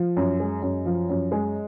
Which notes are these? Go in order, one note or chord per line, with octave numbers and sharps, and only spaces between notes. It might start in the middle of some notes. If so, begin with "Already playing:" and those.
Already playing: F3
F#2
G#3
F#2
F3
F#2
G#3